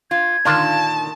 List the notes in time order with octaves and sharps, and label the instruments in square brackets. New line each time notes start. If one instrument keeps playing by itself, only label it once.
[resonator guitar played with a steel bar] F4 [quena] G#6
[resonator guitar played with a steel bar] A#2 D3 D#3 [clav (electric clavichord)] D4 F4 [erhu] A5